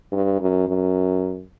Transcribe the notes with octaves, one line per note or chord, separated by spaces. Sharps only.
G2
F#2
F#2